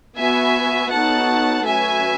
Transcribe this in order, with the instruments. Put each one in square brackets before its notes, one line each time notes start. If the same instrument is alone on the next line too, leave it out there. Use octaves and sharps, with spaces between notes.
[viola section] B3 F#4 B4 [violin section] E5 G#5
[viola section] B3 D#4 F#4 A4 C#5 [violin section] F#5 A5
[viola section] F#3 A3 C#4 F#4 B4 [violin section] E5 G#5